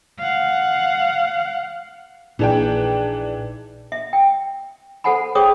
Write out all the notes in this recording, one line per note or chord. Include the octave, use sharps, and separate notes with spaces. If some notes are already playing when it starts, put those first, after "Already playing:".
F5 F#5
A#1 A#2 E3 D4 D#4 G#4 B4 G5
E5
G5
A4 C5 F#5 G#5 B5
G#4 C5 C#5 G5 D6 D#6